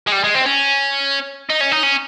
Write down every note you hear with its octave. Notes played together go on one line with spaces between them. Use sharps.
G#3
G3
G#3
C4
C#4
D#4
C#4
D#4
C#4